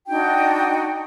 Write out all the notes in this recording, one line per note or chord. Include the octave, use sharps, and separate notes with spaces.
D4 D#4 F#4 G5